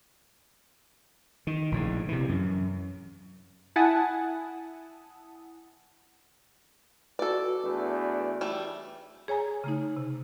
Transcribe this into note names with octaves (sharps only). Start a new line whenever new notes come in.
D#3
A#1 A2 C#3
C3 E3
F#2
E4 F#5 G#5 A5 D#6
F#4 A4 B4 D5
E2 A3 D4
E3 G3 A3
G#4 C#5 G#5 A#5
C#3 A3 D#4
C3